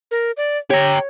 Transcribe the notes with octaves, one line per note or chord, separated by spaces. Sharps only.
A#4
D5
G4 C#5 G5 A#5